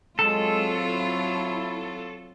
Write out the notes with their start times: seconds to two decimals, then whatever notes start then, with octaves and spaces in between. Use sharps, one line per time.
0.19 F#3 G#3 C4 F4 A4
0.85 E4